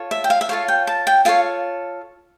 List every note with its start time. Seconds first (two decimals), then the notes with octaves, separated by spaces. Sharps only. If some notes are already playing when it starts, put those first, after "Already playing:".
Already playing: F4 A4 C#5
0.11 E5
0.24 G5
0.30 F5
0.41 E5
0.49 F4 A4 C#5 F5
0.68 G5
0.87 A5
1.07 G5
1.25 F4 A4 C#5 F5